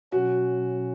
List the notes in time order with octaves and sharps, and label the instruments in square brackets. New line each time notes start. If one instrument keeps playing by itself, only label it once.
[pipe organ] B2 F#3 C#4 [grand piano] F#4